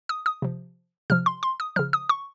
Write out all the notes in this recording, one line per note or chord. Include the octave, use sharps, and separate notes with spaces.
D#6
D#6
C3 F3
C3 F3 F6
C6
C6
D#6
C#3 F3 F6
D#6
C#6